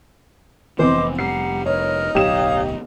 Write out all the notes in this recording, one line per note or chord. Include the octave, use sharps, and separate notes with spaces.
F1 E3 B3 C4 C5 D#5 C6 D6
G3 F#5 A#5 C7
D#4 A#4 B4 C#5 F6
D1 B1 B3 G4 C#5 F5 D#6 E7